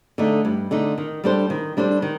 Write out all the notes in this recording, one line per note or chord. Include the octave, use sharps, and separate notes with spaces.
D3 A3 D#4
G2
D3 A3 D#4
D#3
G3 D4 A4 C5
D#3
G3 D4 A4 C5
D#3